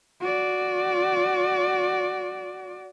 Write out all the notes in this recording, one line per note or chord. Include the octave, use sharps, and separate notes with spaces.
F#4 D5